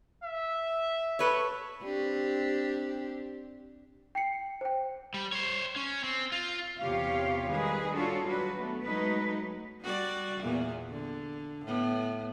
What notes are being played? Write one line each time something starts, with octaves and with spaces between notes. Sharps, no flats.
E5
A4 B4 C#5
C4 D4 G4
G5 C7 C#7
C5 G5
G3
C5 C#5
C#4
C4
F4
E2 C3 F4 G4 C#5 F5
D#3 G3 G#3 G#4 B4
D4 F4 F#4 A4 C#5
F#3 G3 D4 F#4 B4
A3 B3
F#3 G#3 A3 D#4 B4
G3 F#4 D5
E2 A#2 B3
D3
A2 B3